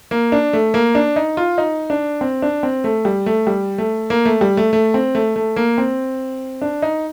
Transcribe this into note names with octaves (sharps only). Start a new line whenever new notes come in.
A#3
D4
A3
A#3
D4
D#4
F4
D#4
D4
C4
D4
C4
A3
G3
A3
G3
A3
A#3
A3
G3
A3
A3
C4
A3
A3
A#3
C4
D4
D#4